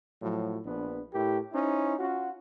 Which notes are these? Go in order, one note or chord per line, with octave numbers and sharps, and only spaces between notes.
A2 F3 F#3
A#1 B3 D4 B4
A2 E4 G4 A#4
C#4 D#4 E4 C5
C#4 F4 F#4